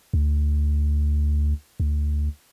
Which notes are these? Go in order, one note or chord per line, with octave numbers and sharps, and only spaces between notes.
D2
D2